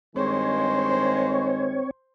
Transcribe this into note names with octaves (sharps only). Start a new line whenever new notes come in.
G2 D#3 G#3 C4 C5 C#5